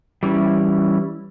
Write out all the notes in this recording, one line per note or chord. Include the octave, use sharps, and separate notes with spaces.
E3 G3 C#4 E4